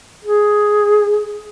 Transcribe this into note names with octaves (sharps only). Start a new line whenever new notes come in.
G#4